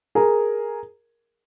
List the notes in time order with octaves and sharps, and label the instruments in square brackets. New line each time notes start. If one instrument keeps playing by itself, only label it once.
[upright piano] G#4 A#4